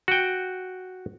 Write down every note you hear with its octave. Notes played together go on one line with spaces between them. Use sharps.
F#4 G5